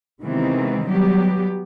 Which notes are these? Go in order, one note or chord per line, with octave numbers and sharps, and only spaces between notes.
C3 D#3 E3 G#3 B3 C4
F#3 G3 B3 G4